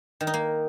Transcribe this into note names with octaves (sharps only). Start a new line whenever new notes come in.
D#3
D#4
A#3